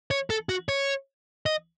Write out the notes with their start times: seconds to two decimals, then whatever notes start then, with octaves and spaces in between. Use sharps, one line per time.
0.11 C#5
0.30 A4
0.49 F#4
0.69 C#5
1.46 D#5